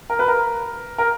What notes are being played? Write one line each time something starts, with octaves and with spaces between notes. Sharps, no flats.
A#4
B4
A#4
A#4